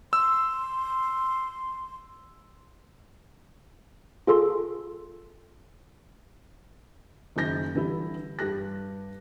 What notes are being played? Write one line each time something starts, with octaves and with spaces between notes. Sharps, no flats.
C6 E6
F4 G#4 A4 C6
F#1 F#2 D#3 G6 A#6
D3 E3 G3 E4
G2 G4 F#6 A#6